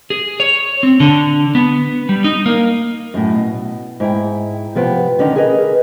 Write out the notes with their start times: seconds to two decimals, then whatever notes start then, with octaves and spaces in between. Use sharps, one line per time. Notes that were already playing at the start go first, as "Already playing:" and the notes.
0.10 G#4
0.40 C#5
0.83 C4
1.00 D3
1.55 B3
2.09 G3
2.24 D#4
2.46 A#3
3.14 F#2 A2
3.34 B2
4.00 G#2 E4 G5
4.75 C3 F3 B3 G5
5.19 D3 D#3 C#4 D#4
5.36 G#4 A#4 B4 C#5 D#5